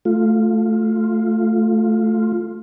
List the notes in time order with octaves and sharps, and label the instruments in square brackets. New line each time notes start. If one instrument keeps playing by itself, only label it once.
[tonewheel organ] A3 F4